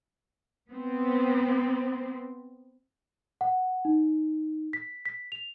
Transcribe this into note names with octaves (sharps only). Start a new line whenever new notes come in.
B3 C4
F#5
D#4
B6
B6
F7